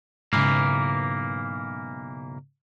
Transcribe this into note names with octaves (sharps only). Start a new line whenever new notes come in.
B1 G#2 C#3 E3 A#3